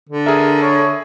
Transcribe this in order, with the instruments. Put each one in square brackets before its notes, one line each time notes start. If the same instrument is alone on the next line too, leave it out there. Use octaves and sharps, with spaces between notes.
[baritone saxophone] D3
[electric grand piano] G#4 E5 [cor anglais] A#4
[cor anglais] C#5